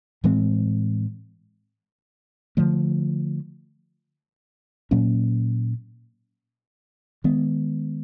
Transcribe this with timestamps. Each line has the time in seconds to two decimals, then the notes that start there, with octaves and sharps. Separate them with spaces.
0.24 A2 E3 G#3 C4
2.57 D3 F3 A3
4.91 A#2 F#3 A#3 C#4
7.24 D#3 G#3 B3